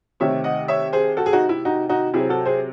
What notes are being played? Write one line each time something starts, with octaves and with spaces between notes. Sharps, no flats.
C3 D#3 A3 C4 C#5 E5
D#5 F#5
C#5 E5
G#4 C5
F#4 A4
G#4
D#4 F#4
E4
D#4 F#4
D#4 F#4
C3 F#3 C4 E4 G#4
F#4 A4
G#4 C5